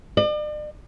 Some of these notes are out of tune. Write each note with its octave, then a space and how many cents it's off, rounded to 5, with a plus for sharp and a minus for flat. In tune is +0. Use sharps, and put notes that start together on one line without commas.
D5 +40